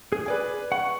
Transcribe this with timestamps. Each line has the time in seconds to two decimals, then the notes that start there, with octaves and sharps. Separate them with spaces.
0.12 G#4
0.26 B4 D5 G#5
0.72 F#5 C#6